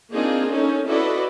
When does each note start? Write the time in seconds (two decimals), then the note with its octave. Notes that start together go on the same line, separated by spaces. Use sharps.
0.12 A#3 C4 D4 D#4 F4 G#4
0.52 C#4 D#4 A4
0.86 E4 F#4 A4 B4 D5 D#5